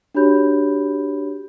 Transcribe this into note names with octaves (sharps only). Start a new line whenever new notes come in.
D4 F#4 G4 C#5 B5 G6